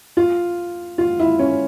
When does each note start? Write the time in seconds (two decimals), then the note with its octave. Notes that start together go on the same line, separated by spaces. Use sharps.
0.17 F4
0.98 F4
1.20 E4
1.39 C#4